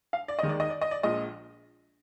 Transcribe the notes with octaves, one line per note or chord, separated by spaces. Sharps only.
F5
D5
D#2 D#3 G#3 D#5
D5
D#5
D5
D#5
D5
A#1 A#2 F3 G#3 D#5